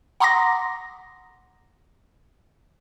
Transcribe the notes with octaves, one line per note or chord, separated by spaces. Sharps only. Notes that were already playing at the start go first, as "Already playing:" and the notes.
F#5 A#5 C6 D6 D#6 A#6